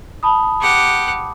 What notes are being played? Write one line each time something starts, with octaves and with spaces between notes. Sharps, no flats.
A5 B5 D#6
G4 F#5